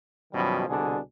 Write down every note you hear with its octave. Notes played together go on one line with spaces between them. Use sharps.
F#2 B2 D#3 F3 G3
C2 B2 D3 D4 G#4